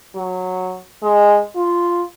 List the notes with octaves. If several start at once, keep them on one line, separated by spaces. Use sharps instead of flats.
F#3
G#3
F4